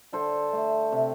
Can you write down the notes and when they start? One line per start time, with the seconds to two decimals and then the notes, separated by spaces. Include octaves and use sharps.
0.12 D3 A4 C5
0.52 A3
0.92 C3